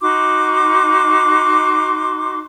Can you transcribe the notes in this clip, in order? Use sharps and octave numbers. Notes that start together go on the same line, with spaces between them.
D#4 F#4 C6 D6